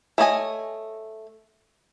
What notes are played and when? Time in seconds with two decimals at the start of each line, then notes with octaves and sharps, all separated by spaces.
0.18 A3 C#5 D#5 G#5